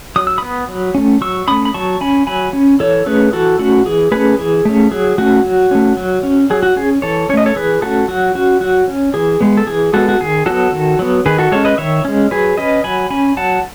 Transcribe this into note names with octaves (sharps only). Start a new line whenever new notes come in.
F#3 D#6
E6
B3 B5 D#6
F#3
A3 C#4
F#3 C#6 E6
A3 C#4 B5 D#6
B5
F#3 A5 C#6
C#4 G#5 B5
F#3 G#5 B5
C#4
E3 A4 C#5
A3 C#4 G#4 B4
E3 F#4 A4
A3 C#4 F#4
E3 G#4
A3 C#4 G#4 B4
E3 G#4
A3 C#4
F#3 G#4
A3 C#4 F#4
F#3
A3 C#4
F#3
C#4
F#3 G#4
F#4
C#4 G#4
E3 A4 C#5
A3 C#4 C#5 D#5
A4 C#5
E3 G#4 B4
A3 C#4 F#4 A4
F#3 F#4
C#4 F#4
F#3 F#4
C#4
E3 G#4
G#3 B3
A4
E3 G#4
G#3 B3 F#4 A4
F#4
D#3 G#4
F#3 B3 F#4 A4
D#3
F#3 B3
D#3 G#4 B4
F#4 A4
G#3 C#4 A4 C#5
B4 D#5
D#3 C#5 E5
G#3 C#4
F#3 G#4 B4
C#4 B4 D#5
F#3 G#5 B5
C#4 G#5 B5
F#3 F#5 A5